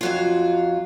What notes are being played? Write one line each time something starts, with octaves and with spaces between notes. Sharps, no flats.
F2 F#3 F4